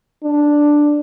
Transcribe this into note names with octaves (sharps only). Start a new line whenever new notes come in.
D4